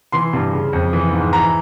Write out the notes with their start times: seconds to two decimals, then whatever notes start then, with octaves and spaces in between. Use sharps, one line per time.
0.12 E3 C6
0.33 G2
0.53 C#3
0.73 F2
0.93 E3
1.13 G#2
1.33 E3 A#5